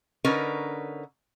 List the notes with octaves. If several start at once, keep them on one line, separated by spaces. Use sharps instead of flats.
D3 C#4 D#4 A#4 B4